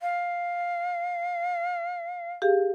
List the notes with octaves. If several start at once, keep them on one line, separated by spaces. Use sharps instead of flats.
F5
G4 G#4 F5